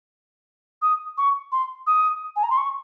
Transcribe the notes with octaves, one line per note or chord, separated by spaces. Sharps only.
D#6
C#6
C6
D#6
G#5
A#5
C6
C#6